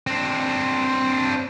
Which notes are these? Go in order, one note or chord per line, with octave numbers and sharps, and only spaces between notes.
C4 D4